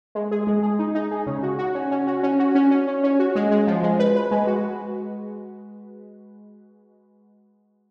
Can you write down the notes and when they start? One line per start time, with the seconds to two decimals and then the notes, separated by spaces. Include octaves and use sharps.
0.15 G#3
0.31 G#4
0.47 G#3
0.63 G#4
0.79 D#4
0.95 D#4
1.11 G#4
1.26 C#3
1.43 F#4
1.59 F#4
1.75 C#4
1.91 C#4
2.07 F#4
2.23 C#4
2.39 F#4
2.55 C#4
2.71 C#4
2.87 C#4
3.04 C#4
3.19 F#4
3.35 G#3
3.51 G#3
3.67 F3
3.83 G#3
3.99 B4
4.16 B4
4.31 G#3
4.47 F#4